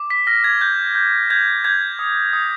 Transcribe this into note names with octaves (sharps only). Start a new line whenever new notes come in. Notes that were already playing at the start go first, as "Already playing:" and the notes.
Already playing: D6
B6
F6 A#6
G#6
G6
G6
G6 G#6
G6 G#6
D#6
D#6